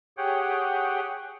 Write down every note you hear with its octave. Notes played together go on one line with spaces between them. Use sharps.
G4 G#4 C#5 F#5 G5